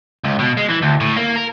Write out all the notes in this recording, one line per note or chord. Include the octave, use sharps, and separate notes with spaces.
C#2
B2
G#3
E3
D2
A2
A#3
A#4